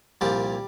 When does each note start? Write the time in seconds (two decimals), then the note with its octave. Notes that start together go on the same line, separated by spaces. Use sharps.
0.21 C2 A#2 F3 G3 G4